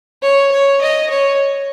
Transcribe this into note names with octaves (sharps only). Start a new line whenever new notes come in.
C#5
C#5
D#5
C#5